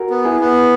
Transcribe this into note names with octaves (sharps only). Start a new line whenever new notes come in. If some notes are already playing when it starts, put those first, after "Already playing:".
Already playing: F#4 A#4
B3
E4 G#4
B3